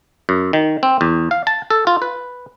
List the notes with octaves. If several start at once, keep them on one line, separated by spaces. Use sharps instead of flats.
F#2
D#3
C4
E2
F5
A5
A4
F4
B4